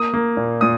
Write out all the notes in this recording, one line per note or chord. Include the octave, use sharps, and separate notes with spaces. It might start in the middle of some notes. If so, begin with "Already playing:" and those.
Already playing: A#3 D#6
A#3
A#2
A#2 D#6